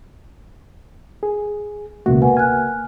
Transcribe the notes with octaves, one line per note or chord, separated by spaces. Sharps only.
G#4
C#2 B2 A#3 F#4
B4 F#5 G#5
G#5 F6 F#6